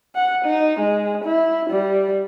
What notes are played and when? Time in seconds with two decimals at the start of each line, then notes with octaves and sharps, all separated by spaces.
0.15 F#5
0.45 D#4
0.80 G#3
1.25 E4
1.70 G3